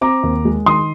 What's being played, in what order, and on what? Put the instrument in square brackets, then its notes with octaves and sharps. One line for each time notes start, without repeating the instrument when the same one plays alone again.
[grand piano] C4 A#5 D6
D#2
G#3
D#3 C6 D#6